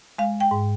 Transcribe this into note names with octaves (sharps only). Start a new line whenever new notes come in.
G#3 F5
G5
G#2